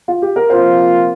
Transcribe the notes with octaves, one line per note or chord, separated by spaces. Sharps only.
F4
G4
A#4
C3 F3 A#3 F4 C5